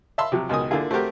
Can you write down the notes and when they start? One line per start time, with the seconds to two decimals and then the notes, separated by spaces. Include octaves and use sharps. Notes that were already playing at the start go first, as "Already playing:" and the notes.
0.18 E5 F5 A5 B5 C6 E6
0.32 C3 F3 F#3
0.49 C#2 B2 D#3 G#5 D#6
0.71 D3 A#3 E4 F4 G#4
0.91 A3 C4 F#4 G4 A#4